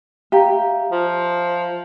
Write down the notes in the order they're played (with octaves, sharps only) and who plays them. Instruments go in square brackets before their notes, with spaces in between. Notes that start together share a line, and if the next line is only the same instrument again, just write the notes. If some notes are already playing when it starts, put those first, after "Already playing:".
[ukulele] G4 [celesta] E5 F5 A#5
[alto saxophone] F3